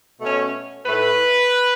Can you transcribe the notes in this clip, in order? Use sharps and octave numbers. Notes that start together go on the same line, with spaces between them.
B2 A3 C#4
A2 A3 E4 B4